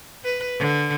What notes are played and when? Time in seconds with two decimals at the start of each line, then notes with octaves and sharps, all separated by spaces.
0.24 B4
0.59 D3